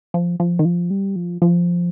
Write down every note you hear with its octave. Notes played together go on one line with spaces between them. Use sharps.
F3
F3
D#3
F3
G3
F3
F3